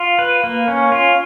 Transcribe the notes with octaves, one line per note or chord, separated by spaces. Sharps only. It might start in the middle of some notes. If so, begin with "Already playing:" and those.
Already playing: F4
B4
A#3
C#4
F4